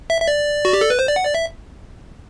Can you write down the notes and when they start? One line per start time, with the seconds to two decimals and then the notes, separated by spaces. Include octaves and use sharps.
0.10 E5
0.21 E5
0.28 D5
0.65 F#4
0.73 G4
0.81 A4
0.90 B4
0.99 C5
1.08 D5
1.16 F#5
1.25 D5
1.35 E5